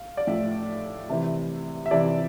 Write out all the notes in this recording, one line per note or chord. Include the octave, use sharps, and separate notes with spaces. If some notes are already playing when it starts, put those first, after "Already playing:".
Already playing: F5
D5
A2 F3 E5
C3 E3
E5
C3 E3 D5